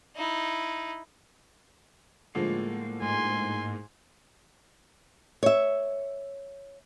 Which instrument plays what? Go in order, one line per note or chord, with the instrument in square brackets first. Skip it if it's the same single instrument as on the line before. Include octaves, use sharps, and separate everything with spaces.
[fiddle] D#4 E4
[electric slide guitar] A2 A#3 [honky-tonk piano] D3 F3 G#3
[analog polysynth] G#2 [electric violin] G#5 C6
[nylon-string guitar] C#5 E5